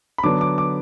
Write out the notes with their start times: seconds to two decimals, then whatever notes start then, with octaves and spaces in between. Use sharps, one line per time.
0.18 B5
0.23 D3 F#3 B3 D4 D6
0.41 D6
0.58 D6